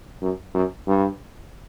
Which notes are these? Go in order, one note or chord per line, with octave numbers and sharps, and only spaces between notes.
F#2
F#2
G2